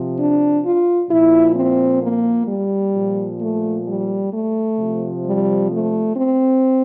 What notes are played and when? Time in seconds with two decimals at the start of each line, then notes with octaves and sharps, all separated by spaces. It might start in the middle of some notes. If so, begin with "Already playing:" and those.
Already playing: C3 F3
0.17 D4
0.64 F4
1.10 A#2 F3 E4
1.55 C4
2.02 A#3
2.47 G3
2.94 A#2 F3
3.39 A3
3.86 G3
4.32 A3
4.78 C3 F3
5.24 G3
5.70 A3
6.16 C4